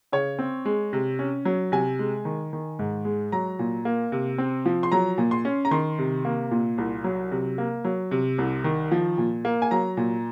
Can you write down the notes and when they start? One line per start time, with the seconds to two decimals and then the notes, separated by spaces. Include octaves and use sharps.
0.12 C#3 C#5
0.39 C4
0.65 G#3
0.93 C3
1.19 C#4
1.45 F#3
1.72 C3 G#5
1.99 G#3
2.25 D#3
2.53 D#3
2.79 G#2
3.05 G#3
3.32 F#3 A#5
3.59 A#2
3.85 A#3
4.12 C3
4.38 C4
4.66 F3
4.83 C6
4.92 F#3 A#5
5.18 A#2
5.31 C6
5.45 C#4
5.65 A#5
5.71 D#3 C6
5.99 C3
6.25 A#3
6.51 A#2
6.78 C2
7.04 F#3
7.31 C3
7.58 A#3
7.85 F#3
8.11 C3
8.38 C2
8.64 D#3
8.92 F3
9.18 A#2
9.45 A#3
9.62 G#5
9.71 F#3 A#5
9.97 A#2